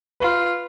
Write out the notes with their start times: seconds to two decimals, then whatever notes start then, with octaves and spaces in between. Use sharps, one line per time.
0.20 F4 B4